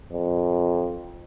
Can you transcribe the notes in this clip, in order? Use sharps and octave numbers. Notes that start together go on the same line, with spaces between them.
F2